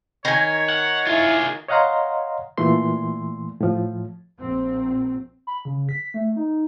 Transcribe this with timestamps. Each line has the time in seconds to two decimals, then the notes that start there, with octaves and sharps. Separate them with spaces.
0.25 D#3 C#5 G#5
0.70 F#5
1.07 E4 F4 G#4
1.68 C#5 D#5 F5 F#5 A#5 C6
2.58 A#2 E3 A3 C6
3.61 A2 F3
4.40 A#1 C4
5.47 B5
5.65 C#3
5.89 B6
6.14 A3
6.36 D#4